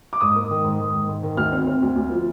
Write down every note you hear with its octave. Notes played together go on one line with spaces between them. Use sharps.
D6
G#2 D#6
A#3
D#3
G#2
D#3
G#2
G#2
D#3
D2 F6
C4
C4
D2
D2
F3